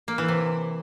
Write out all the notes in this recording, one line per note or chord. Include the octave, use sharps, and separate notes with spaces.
A#3
E3
C3